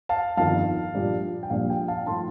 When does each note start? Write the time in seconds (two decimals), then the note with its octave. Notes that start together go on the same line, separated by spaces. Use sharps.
0.09 F5 A5
0.37 G1 F2 D#3 F5 A5
0.95 A#1 A#2 G3 D4
1.43 G5
1.50 A#1 A#2 G3 D4 F5
1.70 G5
1.88 F5 A5
2.06 A2 F3 A3 D#4 A5 C6